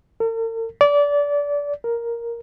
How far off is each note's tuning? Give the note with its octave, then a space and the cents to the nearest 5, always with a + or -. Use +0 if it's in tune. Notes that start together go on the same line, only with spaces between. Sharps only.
A#4 -45
D5 -25
A#4 +5